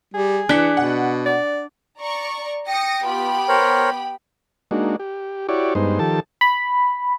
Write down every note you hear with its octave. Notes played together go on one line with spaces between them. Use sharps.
G3 G#4
E3 D4 F#6 B6 C#7
B2 F#5
D5
D5 A#5 C#6
G5 D#6 A#6 C#7
B3 F4 G4 B5
A#4 C5 C#5
G#3 A#3 D4 D#4 F#4
G4
E4 F#4 G4 C#5 D5
G2 G#3 B3 D#4 C5
D#3 F3 G4 A4 A5
B5